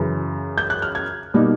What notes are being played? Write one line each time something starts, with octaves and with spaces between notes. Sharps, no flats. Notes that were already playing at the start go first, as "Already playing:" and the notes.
Already playing: F#2 C#3 E3
G6
F#6
F6
G#6
B2 G3 A#3 D#4